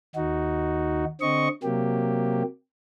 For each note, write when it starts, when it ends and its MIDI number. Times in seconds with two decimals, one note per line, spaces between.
0.16 1.05 39
0.16 1.05 63
0.16 1.05 66
1.21 1.48 50
1.21 1.48 60
1.21 1.48 75
1.21 1.48 85
1.63 2.43 48
1.63 2.43 54
1.63 2.43 58
1.63 2.43 67